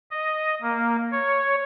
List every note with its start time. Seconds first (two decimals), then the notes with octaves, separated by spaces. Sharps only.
0.11 D#5
0.62 A#3
1.12 C#5